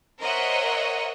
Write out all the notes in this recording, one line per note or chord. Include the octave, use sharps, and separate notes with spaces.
A#4 C5 C#5 D#5 E5 F#5